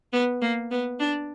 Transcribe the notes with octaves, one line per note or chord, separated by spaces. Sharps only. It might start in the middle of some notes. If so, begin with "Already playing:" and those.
B3
A#3
B3
D4